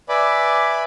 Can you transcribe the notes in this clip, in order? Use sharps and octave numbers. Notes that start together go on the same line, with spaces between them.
B4 D5 E5 G#5 B5 D6